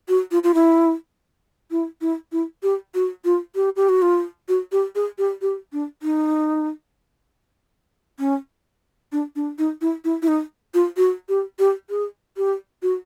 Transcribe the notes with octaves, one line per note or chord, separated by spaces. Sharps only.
F#4
F4
F4
E4
E4
E4
E4
G4
F#4
F4
G4
G4
F#4
F4
F#4
G4
G#4
G4
G4
D4
D#4
C#4
D4
D4
D#4
E4
E4
E4
D#4
F4
F#4
G4
G4
G#4
G4
F#4